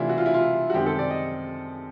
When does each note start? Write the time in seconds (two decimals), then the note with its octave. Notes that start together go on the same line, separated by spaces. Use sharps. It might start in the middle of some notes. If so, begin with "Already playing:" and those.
Already playing: C3 E3 A3 D4 E4 F4
0.09 F#4
0.18 F4
0.26 E4
0.34 F4
0.70 F#4
0.74 F#2 D#3 G#3 C4 G4
0.87 A4
0.99 D5
1.11 D#5